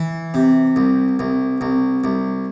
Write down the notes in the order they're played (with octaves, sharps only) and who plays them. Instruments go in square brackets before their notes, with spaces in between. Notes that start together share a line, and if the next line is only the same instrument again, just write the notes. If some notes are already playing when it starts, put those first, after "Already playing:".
Already playing: [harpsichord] E3
C3
C2
C2
C2
C2